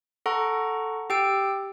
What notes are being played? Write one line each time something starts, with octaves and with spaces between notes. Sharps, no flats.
A4 F#5 A#5 C#6
G4 G5 E6 D7